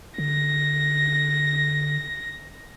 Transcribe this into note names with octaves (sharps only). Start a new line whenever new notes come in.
D3 A#6